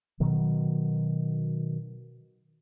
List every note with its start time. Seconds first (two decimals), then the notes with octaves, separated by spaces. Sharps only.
0.20 B2 D#3 F#3